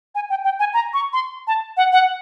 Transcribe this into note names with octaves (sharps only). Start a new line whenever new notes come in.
G#5
G5
G5
G#5
A#5
C#6
C6
A5
F#5
F#5